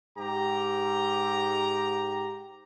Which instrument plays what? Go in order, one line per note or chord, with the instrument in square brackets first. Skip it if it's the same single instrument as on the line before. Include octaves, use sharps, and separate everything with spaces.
[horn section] G#2 G4 A#5